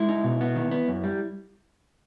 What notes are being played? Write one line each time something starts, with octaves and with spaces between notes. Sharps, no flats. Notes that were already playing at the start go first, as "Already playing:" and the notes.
Already playing: G#3 E4
D#4
B2
B3
D#3
B3
F#2
G3